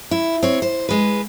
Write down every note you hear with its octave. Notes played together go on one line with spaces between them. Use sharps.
E4
C4 C#5
C5
G#3 B4